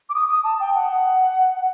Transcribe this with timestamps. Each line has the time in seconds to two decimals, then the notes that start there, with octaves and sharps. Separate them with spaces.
0.09 D6
0.15 D#6
0.29 D#6
0.44 A5
0.60 G5
0.75 F#5